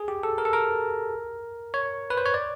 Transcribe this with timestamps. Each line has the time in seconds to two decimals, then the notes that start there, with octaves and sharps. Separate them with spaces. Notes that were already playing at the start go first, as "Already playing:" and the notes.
Already playing: G#4
0.08 G4
0.23 A4
0.38 A#4
0.45 A4
0.53 A#4
1.74 C#5
2.10 B4
2.18 C5
2.25 C#5
2.34 D5